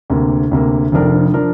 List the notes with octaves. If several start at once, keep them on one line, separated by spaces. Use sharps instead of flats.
D2 C3 A#3
D2 C3 A#3
F1 F2 F3 D4 A#4
F3 D4 A#4